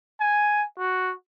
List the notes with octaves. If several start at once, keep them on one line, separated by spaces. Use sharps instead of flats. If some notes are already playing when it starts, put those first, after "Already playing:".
G#5
F#4